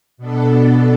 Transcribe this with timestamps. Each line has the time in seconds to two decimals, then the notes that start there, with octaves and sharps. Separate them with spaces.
0.17 B2 B3 D4 A4